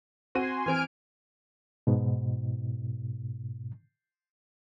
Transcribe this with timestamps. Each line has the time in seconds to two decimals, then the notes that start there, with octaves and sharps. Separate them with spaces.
0.35 C4 F#4 G#5 C6 D#7
0.66 E3 C4 G#5 F6 D7
1.87 G#2 B2